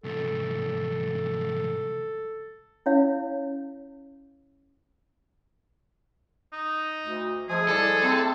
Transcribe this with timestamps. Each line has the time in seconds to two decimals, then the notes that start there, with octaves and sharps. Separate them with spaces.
0.04 C2 G#2 A4
2.86 C#4 E4 C#5 F5
6.53 D#4
7.04 D2
7.49 F3 G#3 A3 E4 G#4
7.69 C2 E4 A4 D5
8.03 C3 A3 C4 E4